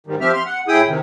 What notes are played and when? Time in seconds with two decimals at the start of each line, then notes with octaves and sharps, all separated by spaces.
0.07 G#2 D#3 G3
0.21 F3 C4 G4 E5 F6
0.33 C6 F6
0.46 F#5
0.68 A2 E4 G#4 G5 D#6
0.88 C3 D#3